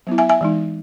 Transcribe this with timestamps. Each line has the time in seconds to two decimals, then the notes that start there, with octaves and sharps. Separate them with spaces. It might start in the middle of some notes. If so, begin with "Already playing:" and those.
0.07 F#3 B3 E4
0.18 E5 G#5
0.29 E5 G#5
0.41 E3 G#3 D#4